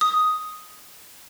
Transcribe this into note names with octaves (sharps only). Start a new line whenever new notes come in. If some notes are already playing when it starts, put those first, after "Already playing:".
D#6